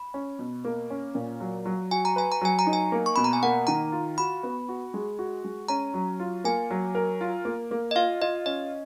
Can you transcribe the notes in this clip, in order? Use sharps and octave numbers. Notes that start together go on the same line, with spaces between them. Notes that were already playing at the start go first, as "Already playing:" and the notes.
Already playing: B5
C#4
B2
A#3
C#4
A#2
F#3
F#3
F#4 G#5
A#5
B4 G#5
A#5
F#3 G#5
A#5
D#4
G#5
A#3
C#6
B2 B5
A#5
G#5
A#3 F#5
D#3 A#5
F4
F#4 B5
B3
F#4
G#3
F#4
G#3
C#4 A#5
F#3
F4
A#3 G#5
F#3
A#4
F4
A#3
A#3
D#5
F4 F5
F4 D#5
C#4 D#5